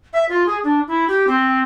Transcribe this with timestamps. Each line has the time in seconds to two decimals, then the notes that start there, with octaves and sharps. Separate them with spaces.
0.13 E5
0.29 F4
0.47 G#4
0.64 D4
0.88 E4
1.08 G4
1.27 C4